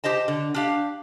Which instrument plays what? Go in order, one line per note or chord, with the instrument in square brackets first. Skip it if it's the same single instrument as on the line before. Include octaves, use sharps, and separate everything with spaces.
[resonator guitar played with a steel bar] G4 C5 D#5 A5
D3
D4 G4 F5